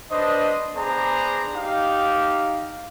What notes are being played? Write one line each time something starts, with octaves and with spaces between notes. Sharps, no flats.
D4 B4 C5 D#5
B3 D4 G#4 C5 D5 A#5
D#4 G4 F5